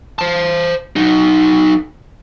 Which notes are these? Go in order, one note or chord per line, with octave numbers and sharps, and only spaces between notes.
C5 A5
F#3 D#4